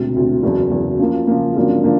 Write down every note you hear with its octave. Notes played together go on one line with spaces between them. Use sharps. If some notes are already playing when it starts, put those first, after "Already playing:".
Already playing: E1 D2 C3
E1 D2 C3
F#1 E2 B2
F#1 E2 B2
C#3 F3 A#3
C#3 F3 A#3
G#1 F#2 D3 F3 A#3
D3 F3 A#3